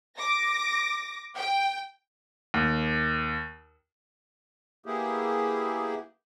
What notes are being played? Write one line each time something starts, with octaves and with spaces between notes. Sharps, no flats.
D6 A#6
G5
D#2
A#3 B3 E4 G4 G#4